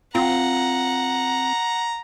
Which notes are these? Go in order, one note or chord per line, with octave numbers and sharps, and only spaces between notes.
C4 F4 F#5 A#5